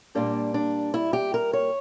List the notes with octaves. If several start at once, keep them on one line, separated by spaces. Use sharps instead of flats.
A#2 G3 A#3 D4
D4
E4
G4
A#4
C#5